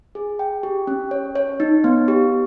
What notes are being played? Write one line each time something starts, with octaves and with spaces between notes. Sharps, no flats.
G#4
G5
G4
C#4
C#5
C#5
D#4
B3
G4